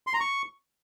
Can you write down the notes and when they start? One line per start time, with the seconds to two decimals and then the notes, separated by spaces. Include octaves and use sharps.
0.07 C6
0.14 A#5
0.20 C#6